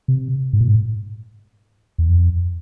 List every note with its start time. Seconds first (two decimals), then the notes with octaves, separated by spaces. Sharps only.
0.08 C3
0.53 G#2
0.61 A#2
0.68 G#2
1.98 E2
2.09 F2